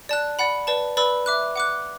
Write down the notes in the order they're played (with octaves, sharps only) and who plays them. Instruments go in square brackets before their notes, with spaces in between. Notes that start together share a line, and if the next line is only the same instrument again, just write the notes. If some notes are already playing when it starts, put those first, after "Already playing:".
[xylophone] D5 A5 F#6
D5 F#5 B5
B4 D5 A5
B4 D5 B5 E6
E5 D6 F#6
F#5 D6 F#6